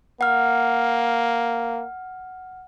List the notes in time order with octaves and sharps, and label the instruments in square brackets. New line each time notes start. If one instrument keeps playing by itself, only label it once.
[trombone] A#3 [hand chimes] F#5 F6